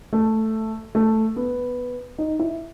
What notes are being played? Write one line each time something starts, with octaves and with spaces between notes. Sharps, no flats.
A3
A3
B3
D#4
E4